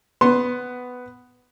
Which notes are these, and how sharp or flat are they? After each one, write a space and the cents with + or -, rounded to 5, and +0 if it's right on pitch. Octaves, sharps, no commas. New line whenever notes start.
B3 +10 C6 +15